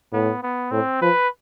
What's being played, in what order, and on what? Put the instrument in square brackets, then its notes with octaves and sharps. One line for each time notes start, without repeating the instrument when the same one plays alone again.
[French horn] A2 [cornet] B3
[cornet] B3
[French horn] A2 [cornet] C4
[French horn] F3 [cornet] B4